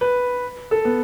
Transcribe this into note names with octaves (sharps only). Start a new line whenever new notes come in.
B4
A4
B3